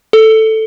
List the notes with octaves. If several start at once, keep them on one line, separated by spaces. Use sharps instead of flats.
A4